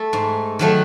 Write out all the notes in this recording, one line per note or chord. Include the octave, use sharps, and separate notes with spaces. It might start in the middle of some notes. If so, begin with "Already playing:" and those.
Already playing: A3 A4
G#2
D#3 F#3 A3